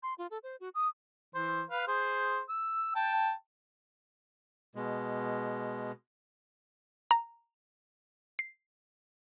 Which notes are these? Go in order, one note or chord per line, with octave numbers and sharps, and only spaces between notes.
C6
F4
A4
C5
F#4
D#6
E3 C5
B4 F5
G#4 C5
E6
G5 A5
B2 G#3
A#5
C7